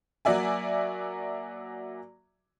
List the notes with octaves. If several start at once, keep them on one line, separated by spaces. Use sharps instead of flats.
F#3 A#3 F#4 D5 E5 G#5